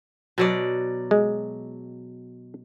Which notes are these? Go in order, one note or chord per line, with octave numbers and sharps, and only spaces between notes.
B2 F#3 D5
G#3